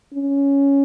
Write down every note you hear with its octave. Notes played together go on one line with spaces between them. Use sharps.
C#4